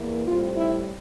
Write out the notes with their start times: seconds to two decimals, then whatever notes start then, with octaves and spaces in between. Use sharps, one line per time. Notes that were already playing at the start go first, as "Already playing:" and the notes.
Already playing: E2 E3 A#3
0.25 A2 G3 C4 F4
0.57 E4